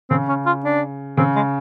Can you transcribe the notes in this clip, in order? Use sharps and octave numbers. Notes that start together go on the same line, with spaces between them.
C#3 C4
C#4
F4
D4
C#3 C4
G#3